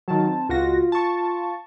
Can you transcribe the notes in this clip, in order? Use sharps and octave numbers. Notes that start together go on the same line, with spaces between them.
D#3 F#3 A5
C4
C#2 F4 F#4 A#6
A5 C#6